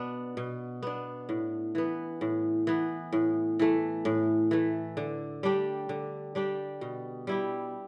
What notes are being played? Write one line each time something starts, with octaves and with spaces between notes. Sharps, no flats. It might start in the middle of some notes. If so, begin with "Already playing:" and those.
Already playing: B2 B3 D4
B2
B3 D4
A2
E3 B3
A2
E3 B3
A2
E3 A3
A2
E3 A3
D3
G3 D4 G4
D3
G3 D4 G4
B2
G3 E4 G4